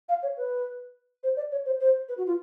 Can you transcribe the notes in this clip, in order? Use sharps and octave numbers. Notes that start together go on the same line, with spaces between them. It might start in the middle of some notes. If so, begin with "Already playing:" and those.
F5
C#5
B4
C5
D5
C#5
C5
C5
B4
F#4
F4